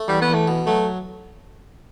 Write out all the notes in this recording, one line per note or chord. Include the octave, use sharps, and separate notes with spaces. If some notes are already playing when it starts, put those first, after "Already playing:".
Already playing: A3
E2 G3
B3
E2
A3
B2
F#3 A3